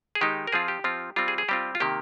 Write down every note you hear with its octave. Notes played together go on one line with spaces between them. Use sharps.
G#4
D#3 G#3 D#4 G4
A#4
F3 C4 F4 G#4
G4
F3 C4 F4
G3 C4 F4
G#4
G#4
G3 C4 F4 G4
F4
C3 D#3 A#3 G4